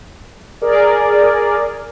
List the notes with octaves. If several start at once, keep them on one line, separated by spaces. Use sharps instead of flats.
G#4 A#4 D5